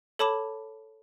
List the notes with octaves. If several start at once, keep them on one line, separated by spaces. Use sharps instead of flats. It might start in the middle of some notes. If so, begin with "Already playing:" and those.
A4 C#5 A5 B5 D6 E7